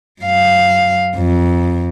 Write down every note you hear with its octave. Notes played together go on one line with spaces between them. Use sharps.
F#2 F5
F2